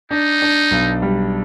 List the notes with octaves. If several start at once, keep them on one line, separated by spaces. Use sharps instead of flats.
D4 D#4
D4
B1
G3